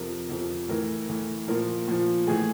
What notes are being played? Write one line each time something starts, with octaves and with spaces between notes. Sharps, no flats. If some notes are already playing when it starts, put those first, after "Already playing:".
Already playing: F2 C3 F3 A#4
F2 C3 F3
A2 E3 A#4
A2 E3
A#2 F3 A#4
A#2 F3
A2 E3 G#4